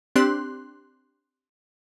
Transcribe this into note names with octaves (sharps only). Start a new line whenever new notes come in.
C4 D4 G4 C6 F#6